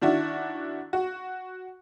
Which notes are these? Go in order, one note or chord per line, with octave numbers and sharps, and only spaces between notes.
D#3 D4 E4 F#4
F#4